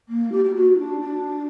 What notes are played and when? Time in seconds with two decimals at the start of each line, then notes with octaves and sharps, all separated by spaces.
0.08 A#3
0.31 G4
0.44 G4
0.54 F#4
0.78 D4
1.01 D4